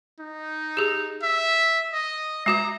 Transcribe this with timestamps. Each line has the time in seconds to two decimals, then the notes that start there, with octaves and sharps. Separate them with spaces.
0.20 D#4
0.77 G4 G#4
1.23 E5
1.93 D#5
2.46 G#3 F#4 E5 A#5